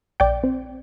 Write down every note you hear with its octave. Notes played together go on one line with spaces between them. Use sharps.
A#1 D5 G5
C4